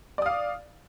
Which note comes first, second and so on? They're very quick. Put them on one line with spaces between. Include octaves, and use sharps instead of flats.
D5 D#6 F5